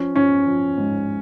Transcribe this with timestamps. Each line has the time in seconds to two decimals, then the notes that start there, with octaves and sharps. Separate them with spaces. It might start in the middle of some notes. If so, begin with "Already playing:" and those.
Already playing: F3 C#4
0.15 F3 C#4
0.46 F3
0.77 G#2